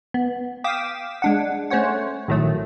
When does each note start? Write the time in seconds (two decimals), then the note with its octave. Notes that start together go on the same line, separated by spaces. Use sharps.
0.14 B3
0.64 F5 G5 D6 D#6 B6 E7
1.22 G#3 D4 F#5
1.70 A3 C#4 C5 C#5 F#5
2.28 A#1 A2 D#3 F#3 A3